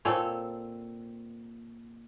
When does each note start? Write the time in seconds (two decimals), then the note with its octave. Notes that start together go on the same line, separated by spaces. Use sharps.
0.05 A#2 C4 A4 C#5